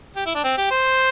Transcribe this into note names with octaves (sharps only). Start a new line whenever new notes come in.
G4
E4
D4
C4
G4
C5